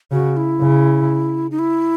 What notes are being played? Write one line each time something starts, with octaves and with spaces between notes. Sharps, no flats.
C#3 F#4
E4
C#3
D#4
E4